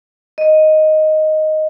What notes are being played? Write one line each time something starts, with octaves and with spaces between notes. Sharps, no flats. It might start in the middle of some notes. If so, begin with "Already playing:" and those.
D#5